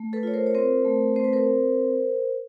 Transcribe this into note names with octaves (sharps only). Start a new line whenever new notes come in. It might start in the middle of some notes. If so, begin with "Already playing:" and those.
Already playing: A3
A4 B4
F4 C#5
A#4 C5
C#5
C4 A#4 C5
A3
C4 C5
B4
A#4 C5